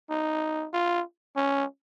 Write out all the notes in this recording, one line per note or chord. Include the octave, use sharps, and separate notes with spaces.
D#4
F4
C#4